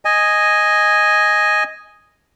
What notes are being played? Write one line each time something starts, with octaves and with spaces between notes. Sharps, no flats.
D#5 G#5